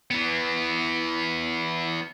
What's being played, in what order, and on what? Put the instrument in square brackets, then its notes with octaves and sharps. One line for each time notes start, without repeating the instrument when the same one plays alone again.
[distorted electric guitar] E3 B3